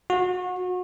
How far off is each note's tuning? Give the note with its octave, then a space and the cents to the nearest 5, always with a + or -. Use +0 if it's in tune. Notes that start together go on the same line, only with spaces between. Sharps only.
F#4 -30